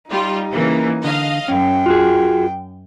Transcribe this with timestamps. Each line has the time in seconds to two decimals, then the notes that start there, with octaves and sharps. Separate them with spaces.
0.10 G3 D#4 F4
0.52 C#3 E3 A#3
1.04 D3 D#5 F5
1.48 F#2 C#4 G5
1.86 F4 F#4 G#4